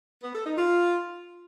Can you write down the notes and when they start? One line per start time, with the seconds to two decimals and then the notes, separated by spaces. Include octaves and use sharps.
0.22 B3
0.34 A4
0.45 D#4
0.57 F4